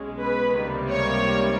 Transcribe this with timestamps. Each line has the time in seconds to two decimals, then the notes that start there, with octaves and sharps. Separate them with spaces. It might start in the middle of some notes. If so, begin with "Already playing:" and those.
Already playing: B1 B2 G#3 C#4
0.19 B4
0.55 C#2 C3 D#3 G3 A#3
0.90 C#5